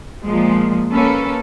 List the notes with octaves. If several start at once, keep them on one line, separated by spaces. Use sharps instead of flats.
A#2 F3 G#3
A#3 C#4 A4 B4